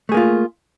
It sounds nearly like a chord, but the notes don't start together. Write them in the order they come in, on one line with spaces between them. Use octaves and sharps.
A3 G#4 A#3 F4